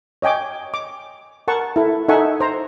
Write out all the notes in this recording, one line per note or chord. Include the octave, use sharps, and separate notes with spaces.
C#5 D#5 G5 G#5 D6
D6
A#4 F#5 A5 C#6
E4 A4
D#4 A4 E5 F#5 G#5 C#6
C5 A#5